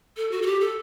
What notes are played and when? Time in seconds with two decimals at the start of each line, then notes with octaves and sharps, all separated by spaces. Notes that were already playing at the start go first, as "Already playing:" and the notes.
0.17 A4
0.31 F#4
0.42 A4
0.46 G4
0.61 A4